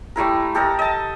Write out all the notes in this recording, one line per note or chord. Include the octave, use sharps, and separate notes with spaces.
G3 A3 E4 A#4
G4 A4 A#4 D#5
D#5 A5